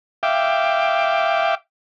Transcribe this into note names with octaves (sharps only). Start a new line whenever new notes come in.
E5 F5 G5 D6